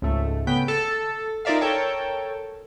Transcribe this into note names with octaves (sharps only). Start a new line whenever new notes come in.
C#2 G#2 A3
C#3 B3 G5 B6
A4
D#4 F4 A#4 D5 E5 F5
A4 A#4 C#5 G5 A5